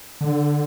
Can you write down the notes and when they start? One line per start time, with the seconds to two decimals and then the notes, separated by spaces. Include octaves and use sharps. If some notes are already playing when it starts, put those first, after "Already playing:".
0.21 D3